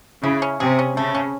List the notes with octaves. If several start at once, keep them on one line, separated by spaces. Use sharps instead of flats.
C#3 E4
C#4
C3 G#4
C#4
C#3 A3
C#4